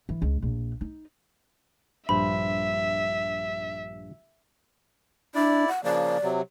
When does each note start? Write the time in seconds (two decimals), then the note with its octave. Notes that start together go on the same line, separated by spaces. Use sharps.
0.09 E3
0.22 C#2
0.42 A#1
0.81 D#4
2.09 A#1 G2 C5 E5 B5
5.35 D4 E4 D5
5.68 F#5
5.84 C#3 F3 A#3 D5
6.23 C3 F#3